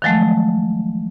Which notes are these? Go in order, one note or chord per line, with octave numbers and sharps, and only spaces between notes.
D#3 F3 F#3 G#3 A3